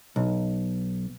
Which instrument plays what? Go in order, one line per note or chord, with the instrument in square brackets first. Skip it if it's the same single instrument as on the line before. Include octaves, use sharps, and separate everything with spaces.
[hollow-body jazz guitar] B1